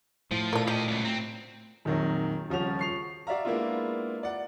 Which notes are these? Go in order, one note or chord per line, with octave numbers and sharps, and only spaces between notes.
A2 F3 C5
A#2 A#3 A4 D5 D#7
A#3 G4 D#5
C#2 B2
C4 A#5
A#1 F2 D#3 F#3
D#1 C#3 F3 C#4 F#4 F7
C#6 C7 F7
F#4 D5 E5 F5 A#5
G#3 A#3 B3 D4 E4 F4
D5 F#5